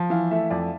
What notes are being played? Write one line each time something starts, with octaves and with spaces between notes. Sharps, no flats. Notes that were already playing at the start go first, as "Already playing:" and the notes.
Already playing: F3
E3 F5
A3 E5
F2 D5